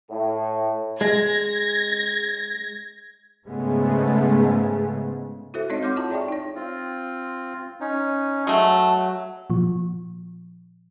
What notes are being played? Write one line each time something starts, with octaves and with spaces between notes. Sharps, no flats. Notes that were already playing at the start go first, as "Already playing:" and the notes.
A2
G#3 G#6 A#6
G#2 C#3 G#3 A3 B3
E4 F#4 A4 C5 E5
G#3 C4 D#4 C#5 D#5
F#5 C6 D6 F6 G6
E4 F4 C#5 A5 A#5
G#4 D5 E5 G5 C#6
D#4 C#5
C4 F4
C#4 D#4
F#3 G#3 A3
A#2 F3